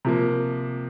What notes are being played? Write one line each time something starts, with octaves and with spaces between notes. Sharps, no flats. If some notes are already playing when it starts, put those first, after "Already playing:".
C3 F3 A#3